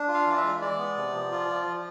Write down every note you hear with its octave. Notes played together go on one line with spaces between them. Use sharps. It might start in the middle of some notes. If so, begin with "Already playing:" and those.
Already playing: D4
F4
F5
E3 D5
E5
G#3
G#3 D5
B3
C3
F3
F4
F3
F3